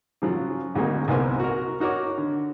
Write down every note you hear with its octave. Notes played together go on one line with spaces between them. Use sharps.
C#3 F3 F#3
G#1 D2 F#3 G#3 A#3 D#4
C2 G#2 A#3 B3 C5 G#5
F#4 A#4
D#4 F#4 A#4 C#5 D6
D3